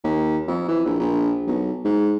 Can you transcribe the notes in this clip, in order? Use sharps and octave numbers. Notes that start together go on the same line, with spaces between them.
D#2
F2
E3
A#1
A#1
B1
G#2